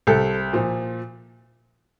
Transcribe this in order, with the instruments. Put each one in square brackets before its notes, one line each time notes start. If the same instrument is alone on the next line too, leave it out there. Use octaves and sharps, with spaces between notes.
[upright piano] C2 A4
A#2 F3